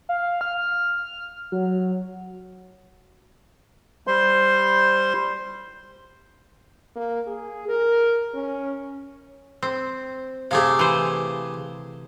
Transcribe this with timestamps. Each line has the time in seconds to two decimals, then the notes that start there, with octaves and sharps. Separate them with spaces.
0.09 F5
0.41 F6
1.52 F#3
4.07 G3 C5 C6
6.96 A#3
7.27 G#4
7.68 A#4
8.34 C#4
9.63 C4
10.51 C3 A3 G4 G#4 F5
10.79 E3 C5